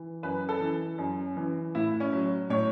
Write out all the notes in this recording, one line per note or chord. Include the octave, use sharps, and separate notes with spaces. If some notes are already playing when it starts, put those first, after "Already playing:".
Already playing: E3
F#2 B4
A4
E3
F#2
E3
A2 E4
C#4
F#3
A2 C#5